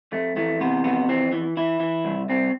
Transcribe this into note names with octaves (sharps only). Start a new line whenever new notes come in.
F2 A3
E3 A3
C3 B3
F2 B3
E3 C4
E3
E3 E4
E3
C2
C2 C4